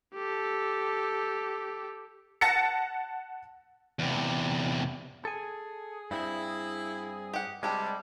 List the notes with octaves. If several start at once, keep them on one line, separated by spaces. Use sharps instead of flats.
G4 A4
F#5 A5 A6 A#6 C#7
E2 C3
G#4 A4 G#5
G2 C4 E4
G4 F#5
C3 G3 G#3 D4 G4 A4